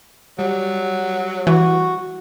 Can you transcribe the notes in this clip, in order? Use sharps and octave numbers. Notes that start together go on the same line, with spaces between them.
F#3 G3
E3 F#4